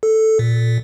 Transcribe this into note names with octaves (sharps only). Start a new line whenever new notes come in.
A4
A#2